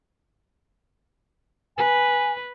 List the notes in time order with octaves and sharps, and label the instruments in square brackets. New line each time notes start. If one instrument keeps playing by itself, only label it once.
[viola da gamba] B4 [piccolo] G#5